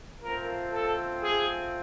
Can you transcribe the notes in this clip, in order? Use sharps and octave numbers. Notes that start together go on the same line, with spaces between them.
A3 C4 F4 A#4
A4
G#4